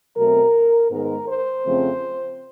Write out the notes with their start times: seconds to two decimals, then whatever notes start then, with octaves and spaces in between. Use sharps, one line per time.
0.17 B2 F#3 A3 C4 A#4
0.91 G#2 D#3 G#3 B3 A#4
1.28 C5
1.66 F2 C#3 F3 A3 C4